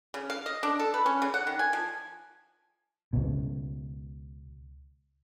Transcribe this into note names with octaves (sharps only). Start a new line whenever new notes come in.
C#3
F5
D#5
D4
A4
B4
C#4
C#3
F#5
D#3
G#5
F3
C#2 B2